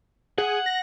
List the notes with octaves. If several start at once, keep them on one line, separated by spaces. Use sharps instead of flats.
G#4 F#5
A#6